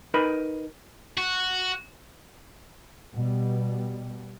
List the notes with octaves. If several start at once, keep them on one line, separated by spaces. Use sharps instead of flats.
D#4 A#4 B4 D#5 B5
F#4
B2 G3